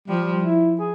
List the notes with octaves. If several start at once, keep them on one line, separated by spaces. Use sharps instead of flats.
F3 G3
E4
G#4